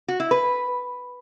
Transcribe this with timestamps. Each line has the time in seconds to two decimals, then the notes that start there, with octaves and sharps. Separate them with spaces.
0.08 F#4
0.20 E4
0.31 B4